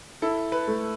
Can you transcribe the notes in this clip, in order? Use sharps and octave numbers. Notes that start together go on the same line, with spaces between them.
E4 A4
B4
A3